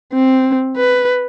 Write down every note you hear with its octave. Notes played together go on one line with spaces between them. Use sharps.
C4
B4